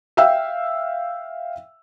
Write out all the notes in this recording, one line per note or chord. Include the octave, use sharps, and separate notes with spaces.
E5 F5 G5 E6